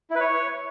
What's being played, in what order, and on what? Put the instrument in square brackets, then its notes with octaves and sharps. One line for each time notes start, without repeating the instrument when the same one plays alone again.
[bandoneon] E4
B4
C#5